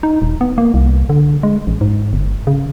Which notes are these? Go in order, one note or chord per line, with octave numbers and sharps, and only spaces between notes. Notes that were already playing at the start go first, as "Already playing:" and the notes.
D#4
D#1
B3
A#3
C2
D3
G#3
A1
G#2
G1
C#3